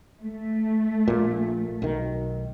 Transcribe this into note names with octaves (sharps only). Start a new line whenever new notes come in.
A3
A#1 A#2
B1 D#3